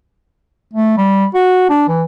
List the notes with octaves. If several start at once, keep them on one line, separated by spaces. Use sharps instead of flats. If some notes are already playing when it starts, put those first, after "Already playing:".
A3
G3
F#4
D4
E3